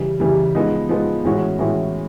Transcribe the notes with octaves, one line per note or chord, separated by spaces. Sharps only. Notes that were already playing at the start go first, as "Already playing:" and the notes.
Already playing: C#3 E3 G3
C#3 E3 G3
F3 G#3 B3 D#4
F3 G#3 B3 D#4
A2 E3 G#3 C#4 F#4
A2 E3 G#3 C#4 F#4